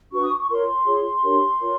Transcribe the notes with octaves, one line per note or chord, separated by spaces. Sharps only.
D4 F#4 B4 C#6
D#6
D6
C#6
F4 A#4 C#5 C6
F4 G#4 C#5
D4 G4 A#4 C#5
F4 A#4 C#5